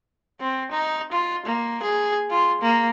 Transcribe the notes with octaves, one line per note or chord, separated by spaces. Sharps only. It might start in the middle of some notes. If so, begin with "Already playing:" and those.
C4
D#4
F4
A#3
G#4
F4
A#3